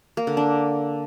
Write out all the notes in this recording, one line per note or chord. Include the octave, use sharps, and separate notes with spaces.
A#3
D3
D4